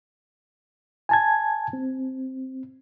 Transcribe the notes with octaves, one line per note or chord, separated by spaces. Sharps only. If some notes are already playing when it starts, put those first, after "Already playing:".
G#5 A5 G#6
C4